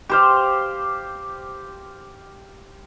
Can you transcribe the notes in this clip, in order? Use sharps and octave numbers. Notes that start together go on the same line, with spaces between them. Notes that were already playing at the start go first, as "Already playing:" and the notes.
G4 C5 F5